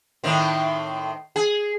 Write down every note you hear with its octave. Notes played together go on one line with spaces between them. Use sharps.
A2 D#3 C4
G#4